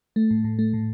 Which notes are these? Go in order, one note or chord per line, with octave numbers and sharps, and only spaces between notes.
A3
A2
A2
A3
A2